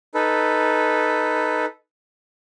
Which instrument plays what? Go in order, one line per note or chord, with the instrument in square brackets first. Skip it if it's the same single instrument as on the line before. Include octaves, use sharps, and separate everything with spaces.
[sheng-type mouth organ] D#4 A4 B4